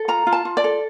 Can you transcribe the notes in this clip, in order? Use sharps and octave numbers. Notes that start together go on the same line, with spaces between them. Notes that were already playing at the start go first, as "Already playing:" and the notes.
Already playing: A4
F4 A#5
F4
A5
F4
D5
A4